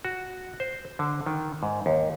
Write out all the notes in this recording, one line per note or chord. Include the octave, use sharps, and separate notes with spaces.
F#4
C5
D3
D#3
G#2
D#2